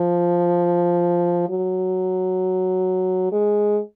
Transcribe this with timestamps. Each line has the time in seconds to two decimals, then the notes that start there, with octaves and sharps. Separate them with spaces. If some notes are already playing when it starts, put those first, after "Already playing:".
Already playing: F3
1.50 F#3
3.32 G#3